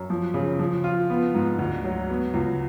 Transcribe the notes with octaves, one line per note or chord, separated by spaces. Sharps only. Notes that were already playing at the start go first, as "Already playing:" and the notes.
Already playing: F#2
F3
C#3
F3
F4
B3
G#2
D2
F#3
B3
C#2